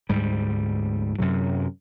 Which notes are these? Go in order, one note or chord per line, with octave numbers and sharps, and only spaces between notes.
D2 G#2 G3
F#2 C3 F#3